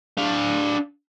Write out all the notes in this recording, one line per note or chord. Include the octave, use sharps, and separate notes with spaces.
D4 F5